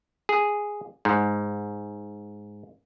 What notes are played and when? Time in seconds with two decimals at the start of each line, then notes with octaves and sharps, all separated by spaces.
0.29 G#4
1.05 G#2